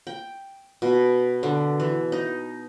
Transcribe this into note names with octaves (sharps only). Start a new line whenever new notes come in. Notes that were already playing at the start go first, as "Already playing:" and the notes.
G5
B2
D3
E3
D#4